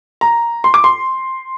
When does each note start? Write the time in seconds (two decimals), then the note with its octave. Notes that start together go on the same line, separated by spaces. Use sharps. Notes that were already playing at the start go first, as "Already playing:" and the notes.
0.21 A#5
0.64 C6
0.74 D6
0.84 C6